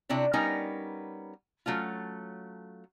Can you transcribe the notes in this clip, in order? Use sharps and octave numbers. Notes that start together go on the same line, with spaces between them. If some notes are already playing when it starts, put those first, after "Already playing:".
C3 D4 E4 C#5
G3 B3 C#4 D#4 A#4
F#3 A3 C#4 F4